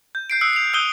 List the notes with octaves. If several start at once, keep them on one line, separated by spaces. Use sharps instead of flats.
G6
G6 C7 D7
D#6 E6 F#6 C7 C#7
C7 F7
D#6 E6 F#6 G6 D#7 G7